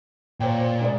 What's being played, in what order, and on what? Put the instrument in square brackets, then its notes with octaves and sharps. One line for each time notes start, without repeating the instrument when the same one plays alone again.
[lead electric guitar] A#2 [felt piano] C5 C#5 G5
[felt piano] G#3 D5